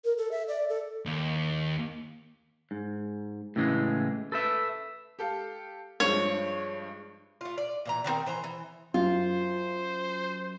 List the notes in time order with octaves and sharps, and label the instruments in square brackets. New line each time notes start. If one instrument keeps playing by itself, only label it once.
[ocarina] A#4
A4
E5
D5
A4
[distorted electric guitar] D#2
[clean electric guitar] G#2
A2 C#3 E3 G#3
A4 B4 E5
[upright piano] G4 A4 F5
[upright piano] G2 F3 G#3 [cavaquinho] C#5
[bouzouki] A3 F4
D5
A#2 E3 A#5
D3 D#3 C4 A#4
E3 C5 A#5
E3
[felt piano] F#2 [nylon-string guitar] F4 [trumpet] C5